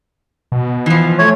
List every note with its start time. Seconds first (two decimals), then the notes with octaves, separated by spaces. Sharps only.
0.52 B2
0.86 E3 F3
1.19 A3 C#5